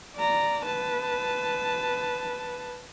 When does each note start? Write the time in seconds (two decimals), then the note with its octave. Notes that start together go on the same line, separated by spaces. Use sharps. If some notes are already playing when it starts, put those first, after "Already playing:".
0.17 D5 A#5
0.66 B4 A5